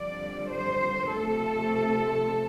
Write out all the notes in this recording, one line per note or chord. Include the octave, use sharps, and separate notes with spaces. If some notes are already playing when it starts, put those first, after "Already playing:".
Already playing: F2 D3 G3 D5
C5
F2 C3 A3 C4 A4